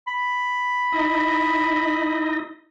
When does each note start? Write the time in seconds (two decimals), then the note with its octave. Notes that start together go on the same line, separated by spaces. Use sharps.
0.07 B5
0.92 D#4 E4 D#5